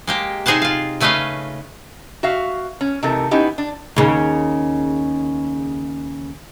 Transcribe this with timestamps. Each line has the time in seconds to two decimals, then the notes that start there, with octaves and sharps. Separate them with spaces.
0.07 G#3 A#3 G4
0.46 C3 D#4 G#4 C5 F#5 A5
0.62 F4 F5
1.00 C#3 A3 C#4 B4 D#5 F5
2.23 F#4 E5 F5
2.81 C#4
3.03 C3 E3 A3 D#4 A4 A#4
3.31 B3 C#4 D#4 E4 G4
3.58 D4
3.96 D#2 C#3